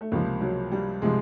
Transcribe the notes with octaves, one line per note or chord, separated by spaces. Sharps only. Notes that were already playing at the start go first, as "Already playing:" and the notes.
A3
C#2 C3 F3 A#3
F#3
G3
C3 F3 G#3